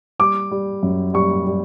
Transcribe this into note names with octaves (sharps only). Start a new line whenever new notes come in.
G3 D6
G3
F#2
G3 C#6
G3